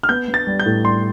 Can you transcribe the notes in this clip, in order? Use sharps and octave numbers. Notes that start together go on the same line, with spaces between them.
F6
B3 G6
B3
A6
G3
G6
A2
G3 C6